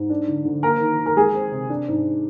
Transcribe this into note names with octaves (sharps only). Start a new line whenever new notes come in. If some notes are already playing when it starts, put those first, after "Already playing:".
Already playing: G#2
D4
D3
D3
A#3 A#4
D#3
D#3
A#4
G#3 G#4
C4
C3
D4
G#2